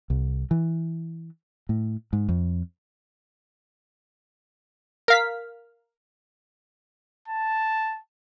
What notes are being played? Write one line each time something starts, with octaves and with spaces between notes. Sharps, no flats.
C2
E3
A2
G#2
F2
A#4 F5 B6
A5